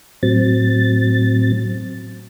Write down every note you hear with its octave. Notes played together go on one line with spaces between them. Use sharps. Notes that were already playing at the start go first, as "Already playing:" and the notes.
A2 F#3 C4 A6